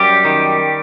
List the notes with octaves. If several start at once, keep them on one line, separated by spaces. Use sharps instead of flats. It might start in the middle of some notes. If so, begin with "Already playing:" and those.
Already playing: F#2 G3 G4
D#3